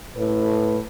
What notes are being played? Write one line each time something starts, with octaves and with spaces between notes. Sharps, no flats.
A2 B4